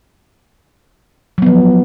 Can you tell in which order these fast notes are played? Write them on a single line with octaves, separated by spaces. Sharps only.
F#3 B3 F3